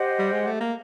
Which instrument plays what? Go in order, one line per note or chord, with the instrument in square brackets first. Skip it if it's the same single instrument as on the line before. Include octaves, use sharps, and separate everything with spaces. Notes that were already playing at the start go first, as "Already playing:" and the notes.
Already playing: [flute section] G4 C5 D#5 F#5
[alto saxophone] G3
G#3
A3
A#3